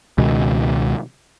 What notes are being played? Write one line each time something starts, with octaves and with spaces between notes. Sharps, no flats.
C#2 B2 D#3 G#3